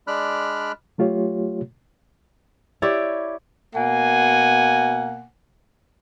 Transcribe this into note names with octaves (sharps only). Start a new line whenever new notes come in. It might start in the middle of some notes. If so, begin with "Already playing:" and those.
G#3 D4 D5 B5 F6 F#6
F#3 A3 F4 G4 C#5
E4 G4 C#5 D5
B2 A#3 F#5 G#5